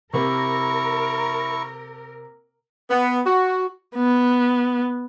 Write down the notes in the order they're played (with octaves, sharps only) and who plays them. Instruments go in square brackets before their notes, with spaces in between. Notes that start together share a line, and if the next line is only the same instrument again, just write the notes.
[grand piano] C3 A#3 [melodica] E4 C#6 [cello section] A#4
[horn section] B3
F#4
[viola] B3